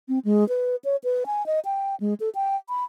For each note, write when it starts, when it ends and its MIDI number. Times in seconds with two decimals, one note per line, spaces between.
0.08 0.19 60
0.25 0.47 56
0.49 0.76 71
0.85 0.96 73
1.04 1.24 71
1.26 1.45 80
1.46 1.60 75
1.65 1.95 79
2.00 2.14 56
2.20 2.29 69
2.35 2.56 79
2.69 2.84 83